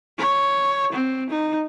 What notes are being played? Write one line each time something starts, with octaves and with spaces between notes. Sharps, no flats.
C#5
C4
D#4